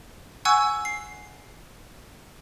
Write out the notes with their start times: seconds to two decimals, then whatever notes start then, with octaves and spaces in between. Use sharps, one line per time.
0.45 F#5 G#5 C#6 E6 F#6 G#6
0.85 C7